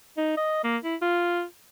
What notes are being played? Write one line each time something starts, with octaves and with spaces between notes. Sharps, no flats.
D#4
D#5
A#3
E4
F4